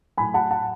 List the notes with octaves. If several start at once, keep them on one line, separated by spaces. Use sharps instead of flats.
A2 F#3 G#5 B5
F#5 A5
F#5 A5